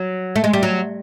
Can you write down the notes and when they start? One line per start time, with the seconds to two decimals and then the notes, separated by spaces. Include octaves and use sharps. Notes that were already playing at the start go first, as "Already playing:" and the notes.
Already playing: F#3
0.36 A3
0.44 G#3
0.53 G3
0.63 F#3